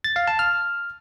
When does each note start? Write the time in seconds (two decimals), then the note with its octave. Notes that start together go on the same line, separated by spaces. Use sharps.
0.04 A6
0.16 F5
0.28 A5
0.39 F6